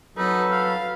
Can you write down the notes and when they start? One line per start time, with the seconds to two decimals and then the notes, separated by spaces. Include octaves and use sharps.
0.17 F#3 D#4 A4 B4
0.51 F5